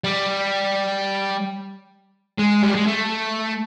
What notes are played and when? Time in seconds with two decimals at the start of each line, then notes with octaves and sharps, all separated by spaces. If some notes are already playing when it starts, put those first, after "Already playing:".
0.04 G3
2.39 G#3
2.64 G3
2.76 G#3
2.87 A3